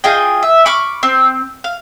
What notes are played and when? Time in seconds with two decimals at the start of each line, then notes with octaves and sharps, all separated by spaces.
0.04 F4 G#4 D#5 G5
0.43 E5
0.66 B5 C#6 D6 F6
1.03 C4
1.64 F5